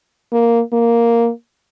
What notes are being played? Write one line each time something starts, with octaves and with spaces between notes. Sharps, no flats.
A#3
A#3